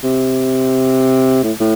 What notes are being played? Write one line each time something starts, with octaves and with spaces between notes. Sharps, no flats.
C3
A2
A2